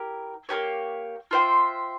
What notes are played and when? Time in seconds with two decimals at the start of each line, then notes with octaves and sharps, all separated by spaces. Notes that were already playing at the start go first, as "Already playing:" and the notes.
Already playing: E4 G4 A#4
0.49 A#3 C#4 G4 C#5
1.31 F4 C5 E5 G5